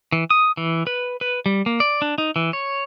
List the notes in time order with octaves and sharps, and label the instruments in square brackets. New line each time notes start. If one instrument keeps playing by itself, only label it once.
[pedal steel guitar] E3
D#6
E3
B4
B4
G3
A#3
D5
D4
D#4
E3
C#5